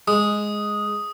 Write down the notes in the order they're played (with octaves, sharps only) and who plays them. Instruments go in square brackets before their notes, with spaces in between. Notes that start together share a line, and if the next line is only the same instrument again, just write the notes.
[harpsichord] G#3 [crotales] D#6